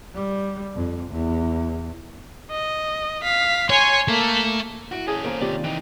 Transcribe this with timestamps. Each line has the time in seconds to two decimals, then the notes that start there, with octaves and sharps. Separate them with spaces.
0.14 G3
0.75 F2
1.11 E2
2.51 D#5
3.23 F5 B6
3.70 C#5 G#5 C6
4.08 A3 A#3
4.92 E4 F#4 D7
5.07 C#4 G#4 A4
5.24 A#3 A#4 C5 D7
5.41 C3 D#3 A#3 F4 G4 D5
5.64 E3 D#4 G5